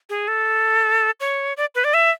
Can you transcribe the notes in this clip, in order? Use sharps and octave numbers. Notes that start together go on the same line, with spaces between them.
G#4
A4
C#5
D5
B4
D5
E5